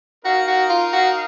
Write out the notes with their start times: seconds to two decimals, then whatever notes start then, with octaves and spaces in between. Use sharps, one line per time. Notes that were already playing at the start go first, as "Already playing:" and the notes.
0.24 D#4 F#4 A#4 F5
0.48 F#4
0.70 F4
0.93 F#4